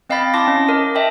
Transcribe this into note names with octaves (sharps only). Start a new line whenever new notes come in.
C4 D#5 F5 G5 B5 A6
E4 A5 C6 D6 A#6
C#4
A#4 D#5
D#5 E5 G5 A5